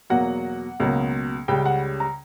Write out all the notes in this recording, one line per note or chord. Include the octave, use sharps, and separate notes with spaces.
E2 B2 F#3 A#3 F#5
C#2 B2 F#3 A#3
C#2 C#3 G3 G5
F#5
A#5